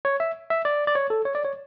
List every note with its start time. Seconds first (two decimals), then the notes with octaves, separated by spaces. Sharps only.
0.05 C#5
0.20 E5
0.50 E5
0.65 D5
0.87 D5
0.95 C#5
1.10 A4
1.25 C#5
1.35 D5
1.45 C#5